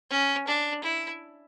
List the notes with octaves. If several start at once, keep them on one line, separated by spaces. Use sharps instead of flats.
C#4
D4
E4